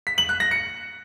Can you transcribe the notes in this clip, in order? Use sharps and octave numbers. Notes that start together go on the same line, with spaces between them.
B6
F#7
F#6
A#6
C#7